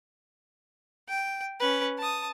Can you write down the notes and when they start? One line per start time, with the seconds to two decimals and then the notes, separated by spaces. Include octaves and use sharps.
1.09 G5
1.60 C#4 B4
1.98 A5 D#6